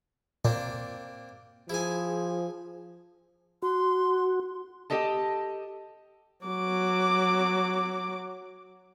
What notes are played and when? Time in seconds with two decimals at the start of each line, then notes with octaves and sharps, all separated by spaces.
0.45 A#2 A#3 C4 D4
1.70 F3 E4 G#4 G#5
3.62 F#4 C6
4.90 G4 A4 D#5 A5
6.46 F#3 D6